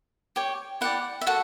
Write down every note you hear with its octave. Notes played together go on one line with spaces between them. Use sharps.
G4 C#5
E4 G4 D5 F#5
E5
F#4 A4 F#5